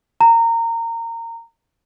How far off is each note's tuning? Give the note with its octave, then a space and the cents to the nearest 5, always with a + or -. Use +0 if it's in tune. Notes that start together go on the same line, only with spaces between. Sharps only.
A#5 -20